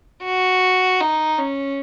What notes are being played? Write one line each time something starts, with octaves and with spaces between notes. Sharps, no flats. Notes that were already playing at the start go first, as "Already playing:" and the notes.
F#4
D#4
C#4